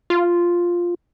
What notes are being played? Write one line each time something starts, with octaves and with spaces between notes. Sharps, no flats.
F4